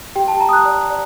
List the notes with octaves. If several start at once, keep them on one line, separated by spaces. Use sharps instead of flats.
G4 G5
A5
G4 A#5
D#6
F#6
D5
D5